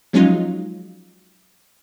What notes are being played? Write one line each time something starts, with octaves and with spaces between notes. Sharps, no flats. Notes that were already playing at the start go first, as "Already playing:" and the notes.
F3 F#3 G#3 C#4 D#4 F4